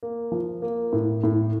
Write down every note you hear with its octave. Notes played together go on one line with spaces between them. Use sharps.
A#3
F3
A#3
A2
A2